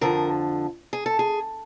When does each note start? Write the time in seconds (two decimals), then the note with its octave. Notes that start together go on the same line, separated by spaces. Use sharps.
0.01 F2 D3 F3 A#4
0.93 G#4
1.06 A4
1.19 G#4